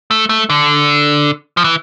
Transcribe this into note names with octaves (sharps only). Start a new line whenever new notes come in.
A3
A3
D3
F3
E3